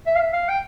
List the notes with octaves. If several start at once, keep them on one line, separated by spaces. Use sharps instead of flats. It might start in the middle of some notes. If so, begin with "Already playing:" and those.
E5
F5
E5
F5
G5